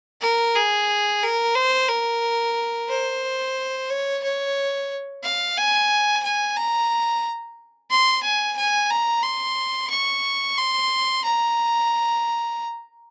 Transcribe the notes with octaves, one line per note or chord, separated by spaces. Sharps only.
A#4
G#4
A#4
C5
A#4
C5
C#5
C#5
F5
G#5
G#5
A#5
C6
G#5
G#5
A#5
C6
C#6
C6
A#5